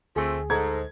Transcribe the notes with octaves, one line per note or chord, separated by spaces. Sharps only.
D2 F3 A3 C4 G#4
G#2 A4 A#5 G#6